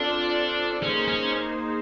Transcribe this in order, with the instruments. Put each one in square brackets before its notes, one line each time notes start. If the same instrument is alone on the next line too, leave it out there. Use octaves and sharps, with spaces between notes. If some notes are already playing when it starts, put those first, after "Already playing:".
Already playing: [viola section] C4 F4 A4 D5 [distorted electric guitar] D4
[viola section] A#3 D#4 G#4 C5 [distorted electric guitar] C#4
[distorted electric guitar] C#4